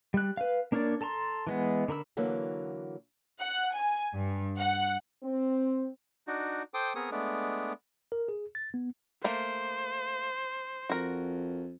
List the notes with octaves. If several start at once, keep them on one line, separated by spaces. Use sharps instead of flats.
G3 F#6
B4 F5
A#3 D4 A#4 C#5 D5
A4 A5 A#5 C6
E3 G#3 B3
D3 A#4 B5 E6
D3 E3 F#3 A#3
F#5
G#5
G2
F#5
C4
D4 D#4 F#4
A4 C5 G5 D6 D#6
B3 C4 G#4 A#4 C#6 D#6
G#3 A3 B3 D4
A#4
G#4
A6
B3
A3 A#3 C5
F2 F#4 A#4